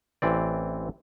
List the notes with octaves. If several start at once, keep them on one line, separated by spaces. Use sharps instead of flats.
A1 E3 C4 D5